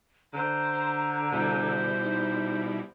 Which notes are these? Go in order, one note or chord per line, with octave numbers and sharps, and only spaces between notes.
D3 C5 A#5
B2 G3 E4 C5
D#4